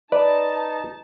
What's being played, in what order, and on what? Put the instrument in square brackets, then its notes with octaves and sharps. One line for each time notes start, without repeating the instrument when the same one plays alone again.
[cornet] D#4 [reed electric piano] B4 [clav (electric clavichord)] D5 [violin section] A5